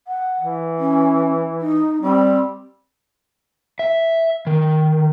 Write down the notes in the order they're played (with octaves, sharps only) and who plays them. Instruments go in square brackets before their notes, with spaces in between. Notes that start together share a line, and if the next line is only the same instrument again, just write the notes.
[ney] F#5
[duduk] E3
[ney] C#4
D#4
[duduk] G3 [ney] C4
[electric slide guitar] E5
D#3